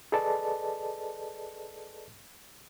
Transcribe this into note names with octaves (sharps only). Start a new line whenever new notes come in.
G#4 A4 B4 D5 D#5 A5